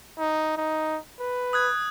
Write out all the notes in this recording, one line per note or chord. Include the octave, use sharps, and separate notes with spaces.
D#4
D#4
B4
D#6 F#6 G#6